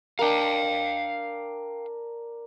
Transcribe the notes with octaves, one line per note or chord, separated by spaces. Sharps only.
D4 A#4 F5 G5